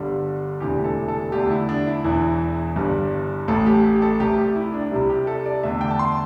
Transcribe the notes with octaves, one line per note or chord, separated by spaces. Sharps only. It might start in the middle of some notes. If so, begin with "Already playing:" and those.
Already playing: G1 G2 D3 G3
E1 D2 C3 E3 G4
A4
A4
E2 D3 A3 G4
E4
D4
E4
E1 E2 E3 E4
G1 G2 G3
A1 A2 A3 A4
G4
G4
A4
C2 C3 A3 G4
G4
E4
D4
C2 C3 G3 E4
G4
A4
D5
E2 D3 A3 E5
G5
A5
C6